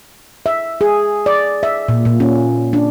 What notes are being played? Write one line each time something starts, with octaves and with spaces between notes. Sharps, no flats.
E5
G#4
D5
E5
A#2
A#2
C#4
D4